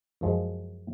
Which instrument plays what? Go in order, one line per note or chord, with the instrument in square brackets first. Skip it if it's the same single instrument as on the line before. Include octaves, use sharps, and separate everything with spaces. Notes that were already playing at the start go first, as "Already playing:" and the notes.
[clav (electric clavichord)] F#2 F3 G#3